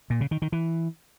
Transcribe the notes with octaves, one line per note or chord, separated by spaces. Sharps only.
A#2
C#3
D#3
D#3
E3